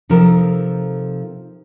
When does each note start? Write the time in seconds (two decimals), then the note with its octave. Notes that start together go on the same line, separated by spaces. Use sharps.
0.09 C3 F3 D#4 A4 A#4